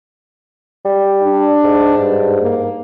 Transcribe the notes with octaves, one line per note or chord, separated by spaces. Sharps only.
G3
D4
G#2
G2
A#3